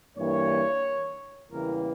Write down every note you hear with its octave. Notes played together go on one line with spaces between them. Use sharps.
G2 E3 A#3 C#5
E2 C#3 E3 G3 A#3 A#4